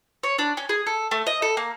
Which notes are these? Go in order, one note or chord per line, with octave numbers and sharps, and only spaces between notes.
C#5
D4
C#4
G#4
A4
A3
D#5
A4
A#3